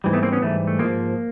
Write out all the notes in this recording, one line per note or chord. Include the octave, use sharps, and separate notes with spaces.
G#2 E3 G3
A3 B3
A#3 C4
B3 C#4
G#2 E3 G3 A3
A3
G#2 F3 G#3 A#3